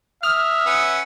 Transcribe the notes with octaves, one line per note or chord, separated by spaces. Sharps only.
E5 D#6 F6
C#4 B4 F#5